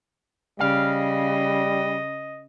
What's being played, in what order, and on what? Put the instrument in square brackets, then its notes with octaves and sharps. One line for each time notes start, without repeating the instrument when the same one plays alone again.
[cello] C#3 [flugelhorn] G3 [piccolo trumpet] D#5 [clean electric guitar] F5